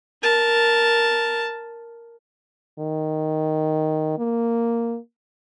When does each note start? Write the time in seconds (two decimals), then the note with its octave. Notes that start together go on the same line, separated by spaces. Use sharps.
0.22 A#4 A5
2.79 D#3
4.18 A#3